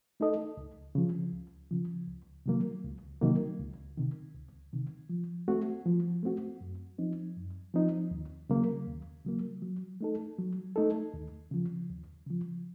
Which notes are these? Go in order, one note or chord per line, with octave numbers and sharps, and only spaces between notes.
A3 D#4 A4 D#5
C#2
C#3 F3
C#2
C#3 F3
C#2
C3 D#3 F#3 A#3
C#2
C3 D#3 F#3 A#3
C#2
C3 D#3
C#2
C3 D#3
F3
A3 C4 F#4
F3
A3 C4 F#4
F#2
F3 C4 D#4
F#2
F3 C4 D#4
D#2
C#3 F#3 A#3
D#2
C#3 F#3 A#3
F#3
A3 D#4 A4
F#3
A3 D#4 A4
D#2
C#3 F3
D#2
C#3 F3